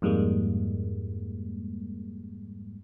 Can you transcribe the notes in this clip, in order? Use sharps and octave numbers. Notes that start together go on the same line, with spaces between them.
F2 G#2 G3 G#3 A#3